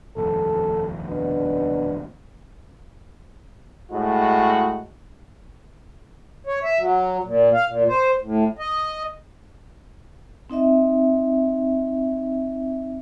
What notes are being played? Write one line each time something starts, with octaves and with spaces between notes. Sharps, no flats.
F1 A#1 D#2 A4
B2 D4
A2 G#3 F#4
C#5
E5
F#3
A#2
F5
A#2
C5
A2
D#5
C4 D#4 D#5 E5